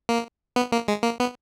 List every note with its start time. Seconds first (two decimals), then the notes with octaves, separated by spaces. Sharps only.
0.09 A#3
0.56 B3
0.72 A#3
0.88 G#3
1.04 A#3
1.20 B3